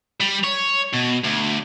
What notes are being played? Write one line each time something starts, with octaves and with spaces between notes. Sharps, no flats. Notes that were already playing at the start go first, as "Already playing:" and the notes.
G3
C#5
B2
D2